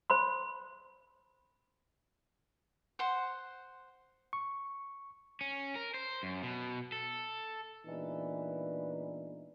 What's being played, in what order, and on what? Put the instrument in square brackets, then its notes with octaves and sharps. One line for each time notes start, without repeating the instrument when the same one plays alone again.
[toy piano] C5 B5 C6
[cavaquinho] C5 F#5
[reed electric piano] C#6
[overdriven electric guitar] C#4
A#4
C5
F#2
B2
A4
[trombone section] A#2 E3 G#3 B3 D4 D#4